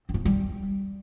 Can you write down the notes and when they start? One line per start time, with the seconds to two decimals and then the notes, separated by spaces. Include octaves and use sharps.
0.09 C4
0.14 B3
0.20 A3
0.25 G3